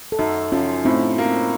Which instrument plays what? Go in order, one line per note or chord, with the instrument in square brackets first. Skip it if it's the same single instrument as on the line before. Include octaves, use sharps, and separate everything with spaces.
[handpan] A4
[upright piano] F#2 [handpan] D#4 F#4
[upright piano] F3 [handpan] C#4 F4
[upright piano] A2 [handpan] C4 D#4
[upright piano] A#3